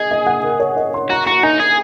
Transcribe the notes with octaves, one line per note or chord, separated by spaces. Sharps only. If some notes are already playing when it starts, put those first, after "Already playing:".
Already playing: G#4 D#5
D#5
F#5
A#4
C#5
D#5
C6
F#4 A#5
F#4 A#5
D#4 G#5
G#4